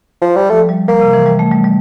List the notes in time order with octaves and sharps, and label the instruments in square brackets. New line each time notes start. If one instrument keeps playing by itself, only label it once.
[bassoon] F3
G3
[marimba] F3 [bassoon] A3
[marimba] G3
[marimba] G3 [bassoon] A#3
[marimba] C3
E3
G3
A3
G3
G3